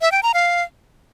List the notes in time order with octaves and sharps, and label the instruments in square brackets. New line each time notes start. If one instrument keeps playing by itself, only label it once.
[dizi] E5
G5
A#5
F5